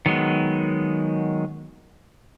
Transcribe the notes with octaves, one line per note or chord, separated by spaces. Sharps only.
D#3 F#3 G#3 B3